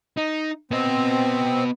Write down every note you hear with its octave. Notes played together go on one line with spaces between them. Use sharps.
D#4
B3 C4 D#5